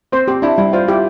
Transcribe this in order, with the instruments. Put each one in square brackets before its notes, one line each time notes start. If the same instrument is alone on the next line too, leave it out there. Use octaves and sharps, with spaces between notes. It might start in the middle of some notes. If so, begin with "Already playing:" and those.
[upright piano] C4 [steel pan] C5
[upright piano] C4 [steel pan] G4
[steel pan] D4 [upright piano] E4
[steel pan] G3 [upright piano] E4
[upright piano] F4 [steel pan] C5
[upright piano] E4 [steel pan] G4